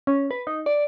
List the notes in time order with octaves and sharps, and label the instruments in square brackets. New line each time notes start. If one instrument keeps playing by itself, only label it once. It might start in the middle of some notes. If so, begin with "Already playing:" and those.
[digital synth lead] C#4
B4
D#4
D5